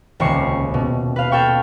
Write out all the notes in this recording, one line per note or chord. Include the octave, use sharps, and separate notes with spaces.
D#1 C#2 C3 C#6 C7
B2
B4 F5
A4 F5 G5 C#6